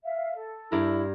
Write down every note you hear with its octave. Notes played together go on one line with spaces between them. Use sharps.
E5 F5
A4
G2 E4 A#4